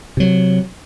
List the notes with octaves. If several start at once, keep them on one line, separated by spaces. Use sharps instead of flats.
C3 F#3